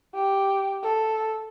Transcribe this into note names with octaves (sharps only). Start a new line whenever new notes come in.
G4
A4